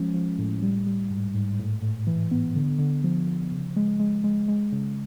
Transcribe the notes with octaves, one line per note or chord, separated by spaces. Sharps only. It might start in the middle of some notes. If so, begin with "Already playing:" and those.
Already playing: F3 G#3 C#4
F3
A2
G3
G3
G#2
G#2
A2
A2
E3
B3
D3
D3
F3
F3
C#3
G#3
G#3
G#3
G#3
C#3